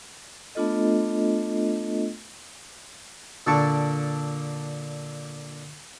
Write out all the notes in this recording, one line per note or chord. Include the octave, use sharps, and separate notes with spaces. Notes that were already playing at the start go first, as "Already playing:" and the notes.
A3 B3 D4 F4 A4 D#5
A#2 D3 D4 A4 A5 C#6